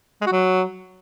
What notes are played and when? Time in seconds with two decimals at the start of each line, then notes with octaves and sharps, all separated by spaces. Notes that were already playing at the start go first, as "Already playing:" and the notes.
0.21 G#3
0.26 F#4
0.32 F#3